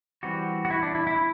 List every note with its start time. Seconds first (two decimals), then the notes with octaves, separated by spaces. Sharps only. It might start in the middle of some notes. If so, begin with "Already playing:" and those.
0.23 E3 G3 C4 F#4
0.65 F#4
0.71 E4
0.83 D4
0.95 E4
1.07 E4